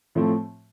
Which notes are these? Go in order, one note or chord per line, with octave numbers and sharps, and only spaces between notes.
A2 F3 A3 C4